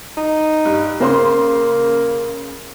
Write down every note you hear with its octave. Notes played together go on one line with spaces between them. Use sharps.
D#4
G2
C#3 A#3 C5 C6